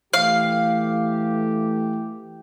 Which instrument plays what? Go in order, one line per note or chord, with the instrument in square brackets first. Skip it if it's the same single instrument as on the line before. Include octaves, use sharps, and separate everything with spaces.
[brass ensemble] E3 A3 G4 [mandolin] F5